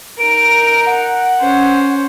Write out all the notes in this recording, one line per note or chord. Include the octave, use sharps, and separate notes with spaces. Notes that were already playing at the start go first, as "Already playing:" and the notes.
D#4 A#4 D7
F#5
C#4 C5